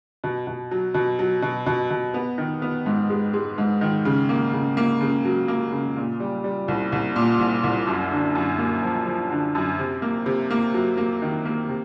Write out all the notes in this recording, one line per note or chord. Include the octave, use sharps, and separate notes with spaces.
B2
B2
F#3
B2
F#3
B2
B2
B2
B3
D#3
B3
G#2
G#3
G#3
G#2
D#3
C#3
A#3
C#3
A#3
C#3
F#3
A#3
C#3
A#2
G3
G3
C2
C2
A#2
C2
C2
F#2
D3
F#2
A#3
F3
F3
D3
F#2
C3
A#3
C3
A#3
F#3
A#3
D#3
A#3
C3